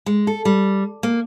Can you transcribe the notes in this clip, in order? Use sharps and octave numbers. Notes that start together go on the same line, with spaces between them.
G#3
A4
G3
A#3